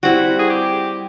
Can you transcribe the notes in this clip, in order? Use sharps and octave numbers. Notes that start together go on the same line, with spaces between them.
G3 C4 E4 F#4
G#4
G4